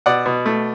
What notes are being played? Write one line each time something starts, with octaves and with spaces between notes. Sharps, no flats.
B2 D5 F#5
B2
A3